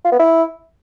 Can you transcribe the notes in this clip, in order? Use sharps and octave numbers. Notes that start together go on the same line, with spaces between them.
F4
B3
E4